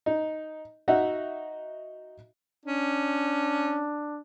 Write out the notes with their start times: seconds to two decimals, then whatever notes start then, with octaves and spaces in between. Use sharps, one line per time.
0.06 D#4
0.88 D#4 F#4 E5 F#5
2.66 C#4 D4